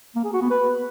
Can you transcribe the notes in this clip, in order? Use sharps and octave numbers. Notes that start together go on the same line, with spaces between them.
A#3
G#4
F#4
B3
B4